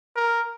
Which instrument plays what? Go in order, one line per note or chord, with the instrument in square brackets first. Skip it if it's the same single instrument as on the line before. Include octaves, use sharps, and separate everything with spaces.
[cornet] A#4